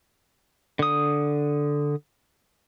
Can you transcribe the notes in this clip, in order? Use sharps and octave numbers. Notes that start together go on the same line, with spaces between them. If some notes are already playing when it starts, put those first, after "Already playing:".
D3 D#6